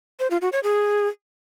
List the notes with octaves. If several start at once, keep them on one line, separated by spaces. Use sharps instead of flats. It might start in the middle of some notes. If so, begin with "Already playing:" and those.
C5
F4
F#4
C#5
G#4